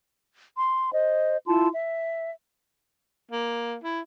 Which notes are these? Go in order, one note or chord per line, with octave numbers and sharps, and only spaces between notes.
C6
C5 D#5
E4 F4 A5 C6
E5
A#3
E4